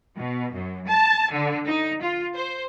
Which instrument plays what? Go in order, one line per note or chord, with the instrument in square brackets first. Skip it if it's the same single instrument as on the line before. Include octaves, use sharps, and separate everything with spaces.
[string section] B2
F#2
A5
D3
D#4
F4
C5